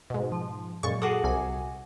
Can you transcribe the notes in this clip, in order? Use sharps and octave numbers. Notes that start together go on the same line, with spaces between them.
G#2 B2
F3
F#2 A#2 G#3 C#6 A6
F#4 G#4 A4 D6 D#6
C2 C3 G#5